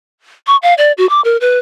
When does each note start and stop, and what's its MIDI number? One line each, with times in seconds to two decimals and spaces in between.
0.47 0.56 85
0.62 0.74 77
0.78 0.92 74
0.98 1.08 66
1.09 1.21 86
1.24 1.37 70
1.41 1.59 71